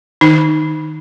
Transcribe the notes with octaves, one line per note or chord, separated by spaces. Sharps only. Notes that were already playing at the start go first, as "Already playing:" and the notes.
D#3 D#4